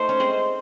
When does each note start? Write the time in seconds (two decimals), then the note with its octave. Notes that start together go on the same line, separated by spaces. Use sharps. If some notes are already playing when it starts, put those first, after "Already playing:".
Already playing: A3 D#4 C5
0.09 C#4
0.20 G#3 C4